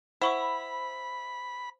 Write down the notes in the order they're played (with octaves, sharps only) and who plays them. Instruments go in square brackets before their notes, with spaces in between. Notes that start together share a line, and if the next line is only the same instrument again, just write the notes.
[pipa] E4 [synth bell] C5 [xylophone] F#5 C#6 E6 [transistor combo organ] B5